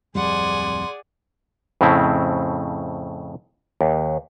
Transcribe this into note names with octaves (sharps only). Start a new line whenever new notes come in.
D1 F2 G3 G#4 D5 F#5 G#5 C6
F2 A2 C#3 C4 E4
D#2